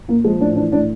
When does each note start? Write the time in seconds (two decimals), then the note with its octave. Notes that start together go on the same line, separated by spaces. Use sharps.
0.08 A#2 A#3
0.24 F3 G#3
0.40 A2 D4
0.56 E3 D4
0.72 A2 D4